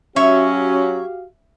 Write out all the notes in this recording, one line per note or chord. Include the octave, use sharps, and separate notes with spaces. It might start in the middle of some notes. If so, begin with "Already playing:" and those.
F#3 C#4 F#4 G4 C#5 E5 F5